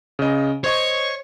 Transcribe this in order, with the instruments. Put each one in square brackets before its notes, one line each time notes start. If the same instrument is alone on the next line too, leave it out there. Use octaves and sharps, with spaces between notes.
[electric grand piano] C#3 D#5
[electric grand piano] C5 D#5 C#6 [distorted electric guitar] C#5